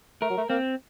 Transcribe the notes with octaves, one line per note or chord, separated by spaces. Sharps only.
A3 A#4
F#3
A3
A#3 C4